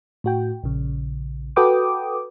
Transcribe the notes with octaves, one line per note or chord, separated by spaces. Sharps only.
A2 F#4 G5
A#1 C#3
F#4 A4 B4 G5 D6 D#6